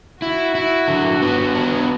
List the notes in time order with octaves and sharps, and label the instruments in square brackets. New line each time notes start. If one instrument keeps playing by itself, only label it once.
[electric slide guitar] E4 [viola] F#4
[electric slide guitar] E4
D3
B3
D4